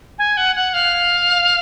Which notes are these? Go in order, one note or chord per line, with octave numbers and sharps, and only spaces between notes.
G#5
F#5
F#5
F5